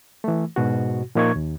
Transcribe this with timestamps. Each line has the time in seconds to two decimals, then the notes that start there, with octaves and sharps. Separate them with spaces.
0.24 E3 A3
0.56 G#2 B2 F#4
1.15 A#2 F3 A#3 D#4 C#6 G#6
1.36 D#2